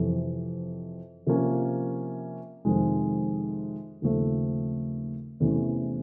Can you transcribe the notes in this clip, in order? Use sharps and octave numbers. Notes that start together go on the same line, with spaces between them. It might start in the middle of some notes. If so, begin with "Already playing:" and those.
Already playing: F2 C3 E3
C3 F3 A#3 C#4
F2 C3 D#3 G#3
D#2 C#3 F3 A3 C4
E2 C3 E3 A3 C#4